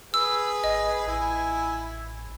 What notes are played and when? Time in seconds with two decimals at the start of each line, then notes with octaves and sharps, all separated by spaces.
0.14 G#4 B4 E6
0.64 G#1 D#5
1.07 A1 E4 G#5